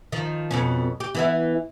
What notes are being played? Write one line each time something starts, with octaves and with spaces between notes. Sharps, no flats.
D#3 F3
F2 B2 C#4
G4
E3 B3 E4